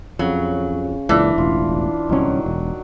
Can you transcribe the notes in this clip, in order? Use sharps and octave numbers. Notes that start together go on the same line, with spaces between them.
F2 C#3 F#3
C#2 A#2 E3 D4
E1 A1 F4
D1 C2 D#3 F#3 C#4
E1